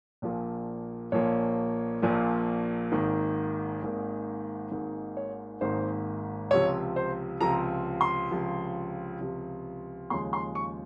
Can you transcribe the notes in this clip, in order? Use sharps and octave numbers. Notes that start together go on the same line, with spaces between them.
A#1 A#2 F3 A#3
A#1 A#2 F3 A#3 C#5
A#1 A#2 F3 A#3
G#1 G#2 D#3 A#3
G#1 G#2 D#3 A#3
G#1 G#2 D#3 A#3
C#5
G#1 G#2 D#3 A#3 C5
C#2 C3 F3 C#5
C5
C#2 C3 F3 A#5
C6
C#2 C3 F3
C#2 C3 F3
D#2 C#3 F3 G#3 C6
C6
C#6